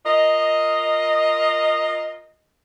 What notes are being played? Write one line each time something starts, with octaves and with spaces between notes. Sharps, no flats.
F4 A#4 D#5